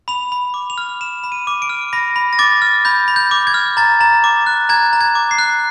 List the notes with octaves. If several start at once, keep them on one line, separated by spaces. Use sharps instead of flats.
B5 F7
B5
D6
F7
F6
B5 E7
B5
D#7
D6
D7
F6
B5 A#6
B5
A#6
D6 A6
F6
B5 G6
B5
G6
D6
G#6
F6
A#5 A6
A#5
D6
F#6
A#5 G#6
A#5
G#6
D6
C7
F#6